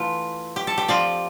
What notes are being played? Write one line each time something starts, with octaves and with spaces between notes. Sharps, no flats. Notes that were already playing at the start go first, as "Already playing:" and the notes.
Already playing: E3 A3 F4
G4
A4
G4
F3 C4 F4 D5